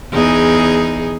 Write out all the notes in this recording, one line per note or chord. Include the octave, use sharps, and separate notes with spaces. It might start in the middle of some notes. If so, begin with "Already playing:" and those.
E2 D#4 G#4